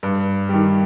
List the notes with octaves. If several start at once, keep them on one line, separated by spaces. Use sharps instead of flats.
G2
D#3 G3